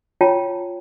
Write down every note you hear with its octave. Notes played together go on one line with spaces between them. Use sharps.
F4 C#5 G5 A5 A#5